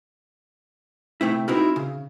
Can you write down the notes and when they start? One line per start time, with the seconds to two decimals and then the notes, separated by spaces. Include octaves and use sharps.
1.21 C3 A3 C4 E4
1.48 C4 D#4 E4 F#4 A#4
1.76 C#3